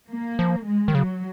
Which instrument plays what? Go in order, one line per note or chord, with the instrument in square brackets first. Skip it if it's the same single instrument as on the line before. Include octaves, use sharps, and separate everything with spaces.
[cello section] A#3
[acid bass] F3
[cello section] G#3
[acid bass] D#3
[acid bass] C#3 [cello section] F#3